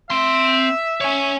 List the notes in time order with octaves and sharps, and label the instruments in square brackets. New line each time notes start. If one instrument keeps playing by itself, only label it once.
[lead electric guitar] C4 C6 [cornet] E5
[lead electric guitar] C#5 G#5